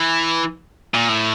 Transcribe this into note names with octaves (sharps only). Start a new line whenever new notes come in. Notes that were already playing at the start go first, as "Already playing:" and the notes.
Already playing: E3
A#2
A2